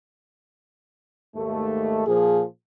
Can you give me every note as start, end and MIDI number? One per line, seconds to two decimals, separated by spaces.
1.35 2.04 39
1.35 2.04 44
1.35 2.04 57
2.06 2.43 46
2.06 2.43 53
2.06 2.42 68